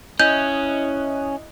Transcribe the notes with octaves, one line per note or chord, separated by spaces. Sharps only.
C#4 E4 D#5 F#6 G6